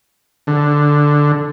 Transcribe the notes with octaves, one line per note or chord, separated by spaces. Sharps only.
D3